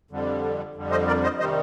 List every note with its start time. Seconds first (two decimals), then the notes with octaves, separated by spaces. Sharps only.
0.11 F2 D3 G3
0.75 F2 D3 G3
0.91 C5 D#5
1.07 A#4 D5
1.23 C5 D#5
1.39 C3 D#3 G3 C5 D#5